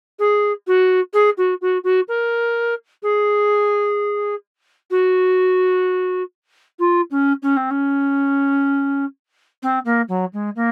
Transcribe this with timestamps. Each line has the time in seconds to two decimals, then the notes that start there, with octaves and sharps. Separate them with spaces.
0.19 G#4
0.67 F#4
1.13 G#4
1.37 F#4
1.61 F#4
1.84 F#4
2.08 A#4
3.03 G#4
4.90 F#4
6.79 F4
7.11 C#4
7.42 C#4
7.56 C4
7.70 C#4
9.62 C4
9.85 A#3
10.08 F#3
10.33 G#3
10.55 A#3